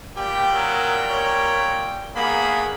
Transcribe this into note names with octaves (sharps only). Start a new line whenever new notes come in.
A#2 G3 G4 G5
F#3 A#4
C#5
G2 A#3 B3 G#4 B5